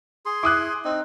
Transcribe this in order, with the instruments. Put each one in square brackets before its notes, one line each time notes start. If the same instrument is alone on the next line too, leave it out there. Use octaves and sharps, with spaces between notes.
[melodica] G#4 C6
[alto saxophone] E4 [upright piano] D6 D#6 F#6
[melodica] C4 [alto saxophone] D#4